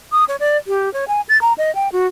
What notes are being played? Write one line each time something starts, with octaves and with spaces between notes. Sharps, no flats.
D#6
C#5
D5
G4
C#5
G#5
A6
A#5
D#5
G5
F#4